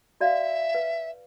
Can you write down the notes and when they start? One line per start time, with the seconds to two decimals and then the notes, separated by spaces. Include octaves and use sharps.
0.21 F#4 D5 E5 F5
0.75 B4